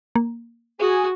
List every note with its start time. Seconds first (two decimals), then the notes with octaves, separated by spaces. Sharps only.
0.15 A#3
0.79 F#4 G#4 G#5